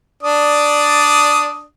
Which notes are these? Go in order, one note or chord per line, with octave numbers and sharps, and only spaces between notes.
D4 D5 D#6